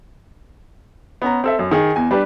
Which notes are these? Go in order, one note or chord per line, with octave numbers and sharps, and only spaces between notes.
B3 C#4 A#5
C4 A4 E5
F#2
D#3 G#4
E2 G#5
G3 D4 G4 B4